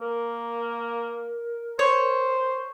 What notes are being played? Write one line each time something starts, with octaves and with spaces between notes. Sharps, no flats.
A#3 A#4
C5 C#5